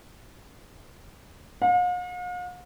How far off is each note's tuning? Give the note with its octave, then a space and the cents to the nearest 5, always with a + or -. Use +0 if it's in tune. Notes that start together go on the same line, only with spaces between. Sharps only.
F5 +45